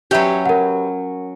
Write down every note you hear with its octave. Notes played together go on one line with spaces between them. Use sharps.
F#3 C#4 G4 B4 E5
A#4 F#5